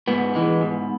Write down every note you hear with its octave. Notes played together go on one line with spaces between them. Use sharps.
G#2 B3
E3 G#3
G#2